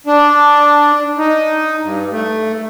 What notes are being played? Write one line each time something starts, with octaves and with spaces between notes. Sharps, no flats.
D4
D#4
G2
A3